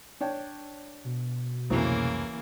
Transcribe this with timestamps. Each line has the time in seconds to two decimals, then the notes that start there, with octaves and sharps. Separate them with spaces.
0.21 D4 C#5 G5
1.05 B2
1.70 C2 F2 A2 C#3 E3 F#3 A#3 C4